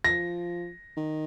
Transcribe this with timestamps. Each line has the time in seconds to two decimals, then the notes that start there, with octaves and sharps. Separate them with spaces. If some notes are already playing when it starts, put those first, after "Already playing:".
0.04 F3 A#6
0.97 D#3